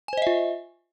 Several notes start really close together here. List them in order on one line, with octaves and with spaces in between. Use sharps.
G#5 C5 D#5 E5 F4